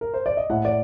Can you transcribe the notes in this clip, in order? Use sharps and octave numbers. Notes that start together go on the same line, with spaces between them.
A#4
C5
D5
D#5
A2 F#5
D5